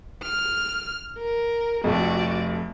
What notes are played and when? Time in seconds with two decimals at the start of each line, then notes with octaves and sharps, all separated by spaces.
0.23 F6
1.18 A#4
1.84 F1 F2 F#4 D5